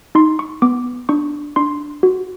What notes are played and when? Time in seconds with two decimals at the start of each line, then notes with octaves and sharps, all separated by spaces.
0.15 D#4 C6
0.39 C#6
0.62 B3 D6
1.09 D4 C#6
1.56 D4 C6
2.03 F#4